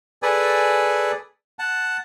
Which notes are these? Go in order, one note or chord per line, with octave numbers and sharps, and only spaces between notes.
G#4 A4 B4 D5 G#5
F#5 A5